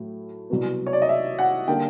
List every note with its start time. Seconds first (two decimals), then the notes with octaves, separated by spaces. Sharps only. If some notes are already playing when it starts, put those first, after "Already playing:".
Already playing: A2 F#3 A3
0.50 C2 B2 F#3 B3
0.87 C#5
0.93 D5
1.02 D#5
1.09 E5
1.39 F#5
1.68 D3 G3 A#3 D4 G5